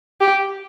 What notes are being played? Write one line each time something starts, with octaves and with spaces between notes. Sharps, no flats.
G4